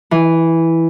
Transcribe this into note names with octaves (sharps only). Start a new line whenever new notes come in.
E3